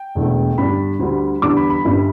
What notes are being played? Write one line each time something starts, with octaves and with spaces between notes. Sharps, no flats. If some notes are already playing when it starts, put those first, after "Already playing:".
Already playing: G5
E1 E2 D3 A3
G2 D3 G3 D4 B5
D2 D3 G3
E2 D3 G3 D4 D6
B5
B5
G1 G2 G3 D4